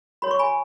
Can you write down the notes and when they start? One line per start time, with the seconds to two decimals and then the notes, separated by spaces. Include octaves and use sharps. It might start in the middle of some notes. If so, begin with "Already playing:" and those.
0.22 F#4 C#5 B5
0.31 C#6
0.39 G#5 B5